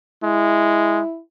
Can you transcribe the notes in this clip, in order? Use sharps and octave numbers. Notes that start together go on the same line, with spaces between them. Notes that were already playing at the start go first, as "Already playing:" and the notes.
G#3 E4